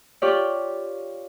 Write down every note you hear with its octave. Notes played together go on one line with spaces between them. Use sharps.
F4 G4 C#5 D5